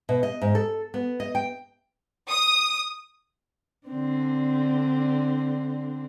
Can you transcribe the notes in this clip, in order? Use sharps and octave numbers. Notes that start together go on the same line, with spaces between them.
B2
D#5
G#2
A4
B3
D#5
G5
D#6
D3 C4 D4